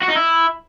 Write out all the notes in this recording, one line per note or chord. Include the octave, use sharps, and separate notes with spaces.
F#4
D#4
E4